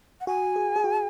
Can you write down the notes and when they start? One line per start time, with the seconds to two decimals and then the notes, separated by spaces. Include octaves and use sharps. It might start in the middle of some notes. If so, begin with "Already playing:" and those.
0.21 F#5
0.27 F#4 G#5
0.56 G#4
0.76 G#4
0.84 F#4